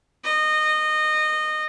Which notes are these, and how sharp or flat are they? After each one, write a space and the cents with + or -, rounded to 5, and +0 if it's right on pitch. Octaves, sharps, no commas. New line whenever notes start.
D#5 -20